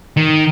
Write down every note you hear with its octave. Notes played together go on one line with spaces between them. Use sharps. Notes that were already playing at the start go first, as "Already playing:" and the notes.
D#3